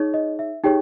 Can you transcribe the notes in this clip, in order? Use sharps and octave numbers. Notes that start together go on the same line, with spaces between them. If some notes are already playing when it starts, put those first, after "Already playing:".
Already playing: D#4 G#4 C#5
D#5
E5
D#4 G4 G#4 C#5 G5